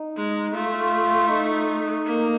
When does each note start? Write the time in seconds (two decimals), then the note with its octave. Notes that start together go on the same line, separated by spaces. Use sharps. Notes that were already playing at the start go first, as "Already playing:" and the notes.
Already playing: D#4
0.17 G#3
0.55 A3 F4
1.30 D#4
2.05 A#3